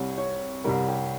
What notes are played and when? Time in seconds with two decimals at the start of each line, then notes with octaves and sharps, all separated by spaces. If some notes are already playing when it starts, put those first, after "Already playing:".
Already playing: C2 C3 G3 C#5
0.18 C#5
0.64 C2 C3 G3 A#4
0.88 G4